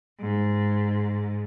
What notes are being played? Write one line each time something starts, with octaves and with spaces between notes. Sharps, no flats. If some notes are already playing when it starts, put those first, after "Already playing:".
G#2